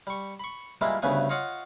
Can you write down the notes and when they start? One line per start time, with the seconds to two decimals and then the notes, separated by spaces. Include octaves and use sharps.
0.07 G3 C#6
0.40 B5 C#6
0.81 E3 G3 G#3 A#3 E4 F4
1.02 D2 G2 C#3 A3 B3 G#5
1.29 F4 C#5 D#5 F5 F#5